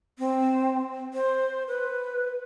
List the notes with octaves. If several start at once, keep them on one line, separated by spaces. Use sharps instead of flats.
C4
C5
B4